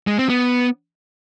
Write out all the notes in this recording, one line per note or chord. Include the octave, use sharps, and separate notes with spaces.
G#3
C4
B3